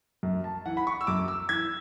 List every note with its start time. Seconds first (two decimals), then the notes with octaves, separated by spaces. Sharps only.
0.23 F#2
0.44 A5
0.66 E3 F#5
0.77 B5
0.87 C#6
1.01 E6
1.07 F#2 D6
1.28 E6
1.49 E3 G#6